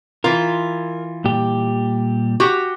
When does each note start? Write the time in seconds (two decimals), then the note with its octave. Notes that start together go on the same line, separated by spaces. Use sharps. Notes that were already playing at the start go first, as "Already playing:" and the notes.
0.24 E3 F4 A#4
1.25 A#2 G3 G4
2.40 F#4 G4